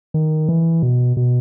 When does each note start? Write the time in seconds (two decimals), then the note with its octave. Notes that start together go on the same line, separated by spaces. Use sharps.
0.14 D#3
0.49 E3
0.82 B2
1.17 B2